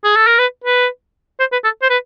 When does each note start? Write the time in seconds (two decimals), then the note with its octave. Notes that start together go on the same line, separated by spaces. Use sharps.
0.04 G#4
0.16 A4
0.27 A#4
0.39 B4
0.64 B4
1.40 C5
1.52 B4
1.64 A4
1.82 C5
1.90 B4